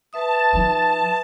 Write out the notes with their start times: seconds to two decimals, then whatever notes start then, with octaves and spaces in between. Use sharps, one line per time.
0.13 B4 E5 A5 D#6
0.53 F3 D#4